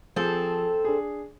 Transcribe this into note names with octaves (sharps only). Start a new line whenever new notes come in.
F3 C4 G#4 A4
D4 G#4